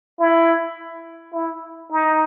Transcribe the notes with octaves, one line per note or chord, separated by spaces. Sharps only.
E4
E4
D#4